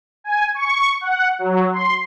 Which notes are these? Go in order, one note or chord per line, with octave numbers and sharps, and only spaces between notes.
G#5
C#6
F#5
F#3
C6